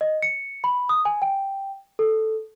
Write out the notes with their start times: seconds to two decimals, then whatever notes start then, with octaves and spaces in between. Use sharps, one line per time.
0.01 D#5
0.22 C#7
0.64 B5
0.89 D#6
1.05 G#5
1.22 G5
1.99 A4